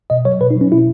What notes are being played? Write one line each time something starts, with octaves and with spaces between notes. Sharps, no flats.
B2 D#5
F#3 C#5
B2 B4
D#4
F#3
C#4
B2 E4